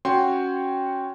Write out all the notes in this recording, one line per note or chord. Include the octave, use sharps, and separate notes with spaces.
C#4 F#4 C#5 G5 C6